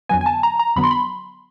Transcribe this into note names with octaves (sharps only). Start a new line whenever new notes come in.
F2 D3 F#3 B3 G#5
G#5
A5
A#5
A#5
F2 D3 F#3 B3 B5
C6
B5